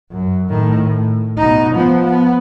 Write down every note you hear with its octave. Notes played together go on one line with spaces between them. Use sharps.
F#2
A2 D#3
A2
B2 D#4
F3 B3
B3